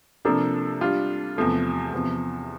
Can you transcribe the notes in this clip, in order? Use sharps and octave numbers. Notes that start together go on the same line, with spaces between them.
C3 F3 A#3 D4 A4
G3 D4 F4
E2 C3 F3 A3
E2 C3 F3